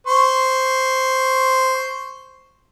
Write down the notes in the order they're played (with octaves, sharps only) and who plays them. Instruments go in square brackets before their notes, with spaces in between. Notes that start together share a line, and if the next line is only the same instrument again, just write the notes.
[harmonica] C5 C#6